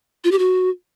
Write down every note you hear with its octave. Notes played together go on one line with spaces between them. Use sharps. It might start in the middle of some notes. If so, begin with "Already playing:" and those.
F4
G4
F#4